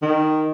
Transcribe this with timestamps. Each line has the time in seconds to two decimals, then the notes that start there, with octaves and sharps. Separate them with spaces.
0.02 D#3